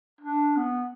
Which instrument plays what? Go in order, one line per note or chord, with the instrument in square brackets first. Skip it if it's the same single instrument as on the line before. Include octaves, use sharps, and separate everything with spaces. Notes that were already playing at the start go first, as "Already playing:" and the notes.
[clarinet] D4
B3